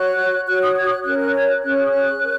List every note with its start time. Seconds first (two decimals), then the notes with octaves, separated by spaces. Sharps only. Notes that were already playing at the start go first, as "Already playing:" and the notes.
Already playing: F#4 C#5 F#6
0.47 F#4 C#5 F#6
0.61 D#6
0.77 G#6
0.84 D#6
0.91 F#6
1.05 C#4 A#4 C#5 F#6
1.20 F#6
1.34 G#6
1.48 F#6
1.63 C#4 G#4 C#5 F#6
1.85 D#6
1.91 F#6
2.20 A#4 C#5